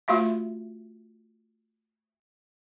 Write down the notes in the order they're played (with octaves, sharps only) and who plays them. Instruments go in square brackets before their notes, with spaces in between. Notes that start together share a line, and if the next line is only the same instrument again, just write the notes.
[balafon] A3 F4 F#4 E5 F5